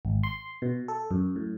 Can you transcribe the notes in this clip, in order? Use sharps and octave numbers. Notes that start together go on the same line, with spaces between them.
G#1
C6
B2
A4
F#2
A2